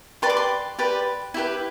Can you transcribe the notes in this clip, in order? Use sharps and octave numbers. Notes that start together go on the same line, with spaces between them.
G4 B4 D5 C6
D6
C6
G4 B4 D5
E4 G4 B4